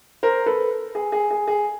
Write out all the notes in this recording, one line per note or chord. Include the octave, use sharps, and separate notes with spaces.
A#4 C5
A4 B4
G#4
G#4
G#4
G#4